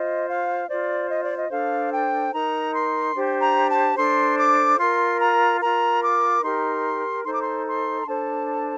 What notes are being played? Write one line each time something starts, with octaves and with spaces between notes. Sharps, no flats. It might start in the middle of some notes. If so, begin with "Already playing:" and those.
Already playing: F4 C5 D#5
F5
F4 C5 D5
D#5
D5
D#5
D4 A4 C5 F5
G5
D#4 A#4 A#5
C6
D4 G4 C5
A#5
A5
D4 A4 C5 C6
D6
F4 A#4 C6
A#5
F4 A#4 A#5
D6
D#4 G4 A#4 C6
D#4 A4 C5 C6
D6
C6
C6
A#5
D4 A4 C5 A5